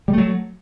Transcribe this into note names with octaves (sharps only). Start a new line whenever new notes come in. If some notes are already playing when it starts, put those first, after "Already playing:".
F#3 G3 A3